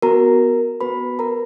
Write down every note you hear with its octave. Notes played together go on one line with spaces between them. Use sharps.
B3 F#4 A#4 A#5
B3 F#4 B4 B5
A#4 A#5